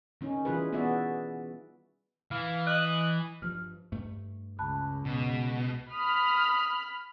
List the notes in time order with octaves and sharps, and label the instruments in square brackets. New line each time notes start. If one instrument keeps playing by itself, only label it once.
[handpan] D#3 C#4 D#4
E3 G3 E4 F4 G#4 B4
B3 F#4 G#4 D5 E5
[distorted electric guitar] E3 [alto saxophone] F5
[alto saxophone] D#5 [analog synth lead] F#6
[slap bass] G2 F3 [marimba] F6
[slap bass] G2 A3
[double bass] C#2 [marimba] A5 B5 F#6
[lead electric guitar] B2
[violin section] B5 F6 [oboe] D#6